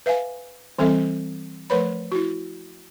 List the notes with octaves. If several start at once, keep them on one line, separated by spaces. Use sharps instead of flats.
B4 E5 F5 G#5
E3 G3 C4 A4 E5
F3 A3 A#4 B4 C#5 B5
E4 F#4